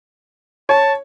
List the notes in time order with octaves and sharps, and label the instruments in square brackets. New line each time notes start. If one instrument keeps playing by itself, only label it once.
[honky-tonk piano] C#5 [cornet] A5